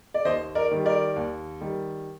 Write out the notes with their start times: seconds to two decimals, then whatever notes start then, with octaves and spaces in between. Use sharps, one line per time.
0.14 D5
0.25 D#2 C5 D#5
0.55 A#4 D5
0.71 D#3 G3
0.85 A#4 D5
1.16 D#2
1.61 D#3 G3